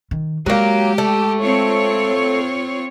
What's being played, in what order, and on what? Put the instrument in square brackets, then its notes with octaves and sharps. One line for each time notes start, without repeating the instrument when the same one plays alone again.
[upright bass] D#3
[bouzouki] F#3 A#3 [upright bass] G#3 [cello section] G4
[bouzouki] A3
[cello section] C4 F4 C#5